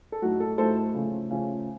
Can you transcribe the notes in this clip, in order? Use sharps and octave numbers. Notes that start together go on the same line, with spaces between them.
A4
A2 F#3 A3 D#4 F#4
A4
A2 F#3 A3 D#4 A4 C5
C#3 F3 A3 C#4
C#3 F3 A3 C#4